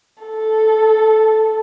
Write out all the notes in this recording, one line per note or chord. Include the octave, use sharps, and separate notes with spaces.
A4